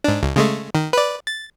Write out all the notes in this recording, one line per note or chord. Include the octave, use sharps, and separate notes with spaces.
G#2 D4
C#2
C#3 G#3 A3
D#3
B4 D5
A6